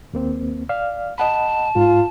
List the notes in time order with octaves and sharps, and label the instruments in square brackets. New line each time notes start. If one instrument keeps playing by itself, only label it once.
[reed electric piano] D#2 A#3 C4
D5 F5 F6
[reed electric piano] D#5 F#5 B5 [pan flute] A5
[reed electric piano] G#2 [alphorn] F4